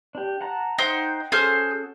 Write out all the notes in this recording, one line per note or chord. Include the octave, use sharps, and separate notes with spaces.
D4 G4
F#5 A5 A#5
D#4 C5 F#5 G5
C#4 F#4 G#4 A4 C5 F6